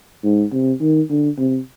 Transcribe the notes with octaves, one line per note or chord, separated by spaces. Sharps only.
G#2
C3
D#3
D3
C3